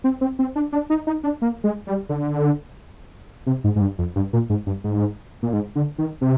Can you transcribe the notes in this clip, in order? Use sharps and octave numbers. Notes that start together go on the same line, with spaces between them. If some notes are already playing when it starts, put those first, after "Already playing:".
C4
C4
C4
D4
D4
D#4
D#4
D4
A#3
G#3
G3
D3
C3
G#2
G#2
G2
F2
G2
A#2
G#2
G2
G#2
A#2
G#2
D3
D#3
C3